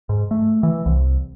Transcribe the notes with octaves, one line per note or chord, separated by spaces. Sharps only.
G#2
A3
E3
C2